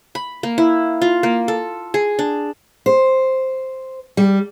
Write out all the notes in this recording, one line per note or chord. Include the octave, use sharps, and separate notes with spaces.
B5
A#3
E4
F4
A#3
A4
G#4
D4
C5
G3